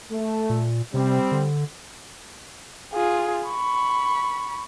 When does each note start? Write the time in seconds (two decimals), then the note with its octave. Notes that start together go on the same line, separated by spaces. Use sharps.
0.11 A3
0.50 A#2
0.94 C3 G3 C4
1.32 D3
2.94 F4 G#4
3.48 B5 C#6